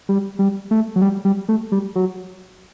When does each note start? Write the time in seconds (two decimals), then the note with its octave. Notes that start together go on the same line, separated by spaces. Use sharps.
0.09 G3
0.39 G3
0.71 A3
0.96 F#3
1.02 G3
1.25 G3
1.49 A3
1.72 G3
1.95 F#3